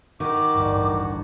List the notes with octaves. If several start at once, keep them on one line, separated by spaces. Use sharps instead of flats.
D#3 F#4 D6
A1 D2 G2